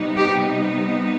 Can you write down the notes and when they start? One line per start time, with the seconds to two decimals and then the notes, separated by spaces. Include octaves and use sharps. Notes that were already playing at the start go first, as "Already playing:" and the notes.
Already playing: C3 G3 B3 D#4
0.17 G4